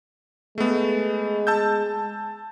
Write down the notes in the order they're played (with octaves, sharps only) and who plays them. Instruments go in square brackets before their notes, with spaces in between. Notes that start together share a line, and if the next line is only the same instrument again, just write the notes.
[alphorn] G#3 [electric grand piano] A3 B3
[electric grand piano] A5 E6 G6